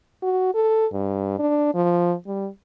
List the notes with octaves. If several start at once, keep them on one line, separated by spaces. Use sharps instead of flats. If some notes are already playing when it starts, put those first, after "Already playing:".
F#4
A4
G2
D4
F3
G3